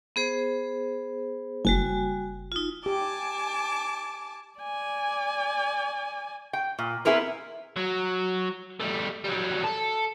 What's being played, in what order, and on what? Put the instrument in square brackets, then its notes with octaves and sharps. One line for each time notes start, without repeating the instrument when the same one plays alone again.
[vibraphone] B3 G#4 C5
[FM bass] F#1 [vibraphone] G3 F#4 G#5
[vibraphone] D#4 F4
[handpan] G4 [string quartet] G#5 A5 D6
[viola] D5 G#5
[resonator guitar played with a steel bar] G5
A#2
B3 C4 E4 G#4 A#4 B4
[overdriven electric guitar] F#3
G3 A3
F#3 G3
A4